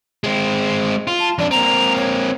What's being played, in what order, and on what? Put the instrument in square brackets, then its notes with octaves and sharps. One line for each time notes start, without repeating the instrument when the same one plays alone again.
[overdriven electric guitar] G#3 C4
F4
[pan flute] A5
[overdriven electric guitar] F2 D4 [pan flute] D5
[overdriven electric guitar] A#3 C4 [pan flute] A#5
[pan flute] C#5